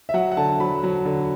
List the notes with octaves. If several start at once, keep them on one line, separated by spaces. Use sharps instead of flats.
E5
F#3 F#5
F#5
D3 A5
F#3 B5
F#3
D3